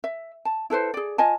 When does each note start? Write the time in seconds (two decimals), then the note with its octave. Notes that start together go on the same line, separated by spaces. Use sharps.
0.04 E5
0.45 A5
0.70 E4 A4 B4 C5
0.94 G#4 D5
1.18 F4 D#5 G#5 A5